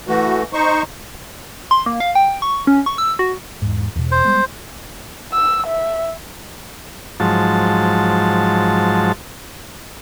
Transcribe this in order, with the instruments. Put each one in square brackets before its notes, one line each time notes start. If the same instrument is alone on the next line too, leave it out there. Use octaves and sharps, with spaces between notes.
[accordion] E3 A3 F#4
D#4 C5 C#6
[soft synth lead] C6
A#3
F5
G5
C#6
C#4
C#6
E6
F#4
[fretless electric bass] E2 G#2
E2 B2
[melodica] C5
[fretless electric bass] G3 G#3 B3
[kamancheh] E6
E5
[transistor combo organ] G#2 F3 F#3 A5